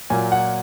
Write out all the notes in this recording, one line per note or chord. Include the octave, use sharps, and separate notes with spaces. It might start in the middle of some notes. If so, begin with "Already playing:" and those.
A#2 F#3 A#3 G#5
F#5